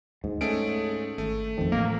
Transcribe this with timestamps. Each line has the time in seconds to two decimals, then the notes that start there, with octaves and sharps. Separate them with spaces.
0.24 D2 G#2
0.41 A3 C#4 G#4 D7
1.18 G#1 A3
1.58 F2 D#3 F3
1.72 A1 A#3